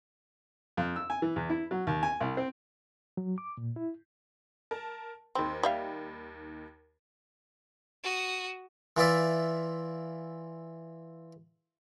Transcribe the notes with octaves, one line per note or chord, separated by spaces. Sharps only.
F2
E6
G#5
E3
E2
E4
F#3
D#2
G#5
C2
C4
F#3
D6
A#2
E4
A#4 A5
D#2 D#3 C4 B5
G3 E5 F5
F#4 D#6
E3 F4 D5 E5